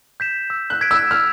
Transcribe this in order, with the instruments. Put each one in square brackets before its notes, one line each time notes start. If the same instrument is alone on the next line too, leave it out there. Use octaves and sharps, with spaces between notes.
[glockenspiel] G6 B6 E7
E6
[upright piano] F#6
[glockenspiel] G#6 B6 D7
[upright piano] E6
[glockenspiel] E6 [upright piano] F6